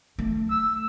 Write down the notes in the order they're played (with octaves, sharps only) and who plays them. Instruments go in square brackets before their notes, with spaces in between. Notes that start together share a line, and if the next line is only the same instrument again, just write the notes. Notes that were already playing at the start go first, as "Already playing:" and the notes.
[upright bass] A3
[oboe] E6